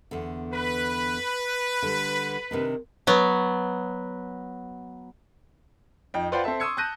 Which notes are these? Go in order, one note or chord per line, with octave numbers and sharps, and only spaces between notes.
E2 D3
B4
D3 G3
C3 D#3 D4
F#3 B3
F2 D#4 G5
F4 B4 C5 D5 F#5 G5
C4 A4 E5 A5
C6 C#6 D#6 E6 G#6 C#7
A5 F#6 G6 A#6 D#7